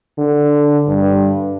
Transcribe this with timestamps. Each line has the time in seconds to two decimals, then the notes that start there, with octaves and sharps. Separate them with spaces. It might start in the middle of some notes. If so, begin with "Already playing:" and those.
0.18 D3
0.88 G2